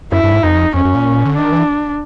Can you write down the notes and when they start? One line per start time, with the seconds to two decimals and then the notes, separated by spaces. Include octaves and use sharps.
0.12 F#2 E4
0.23 G2
0.32 G#2
0.43 F2 D#4
0.74 F2 C#4
0.85 F#2
0.94 A#2
1.25 D3
1.36 D#3 D4
1.52 E3